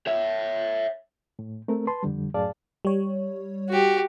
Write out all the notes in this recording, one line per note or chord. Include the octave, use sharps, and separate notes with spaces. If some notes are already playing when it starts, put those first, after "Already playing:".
C#5 E5
A2
A3 C4 A#4
B4 A5 C6
F2 D3 G3
F#2 A2 G#4 D5 F5 A5
G3 C#5
F#4 G4